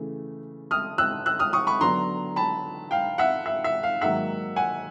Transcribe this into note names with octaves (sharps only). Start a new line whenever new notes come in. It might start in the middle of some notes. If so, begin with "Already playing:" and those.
Already playing: C#3 E3 A3
D#6 F6
E6 F#6
E6 F#6
D#6 F6
C#6 D#6
B5 C#6
D3 F#3 B3 D4 A#5 C6
A5 B5
F5 G5
E5 F#5
E5
E5
F5
G#2 D#3 F#3 A#3 E5 F#5
F#5 G#5